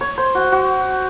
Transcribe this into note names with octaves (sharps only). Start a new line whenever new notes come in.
C#5
C5
F#4
F#4